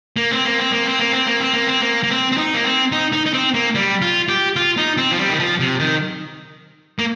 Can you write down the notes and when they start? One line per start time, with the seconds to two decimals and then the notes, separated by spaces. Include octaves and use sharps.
0.17 A#3
0.31 C4
0.45 A#3
0.58 C4
0.72 A#3
0.85 C4
0.99 A#3
1.13 C4
1.27 A#3
1.40 C4
1.53 A#3
1.67 C4
1.81 A#3
2.03 A#3
2.10 C4
2.32 C4
2.37 D#4
2.54 A#3
2.64 C4
2.92 D#4
3.12 D#4
3.26 D#4
3.34 C4
3.54 A#3
3.75 G3
4.02 F4
4.29 G4
4.56 F4
4.77 D#4
4.97 C4
5.11 F3
5.18 G3
5.30 D#3
5.39 F3
5.60 C3
5.80 D#3
6.99 A#3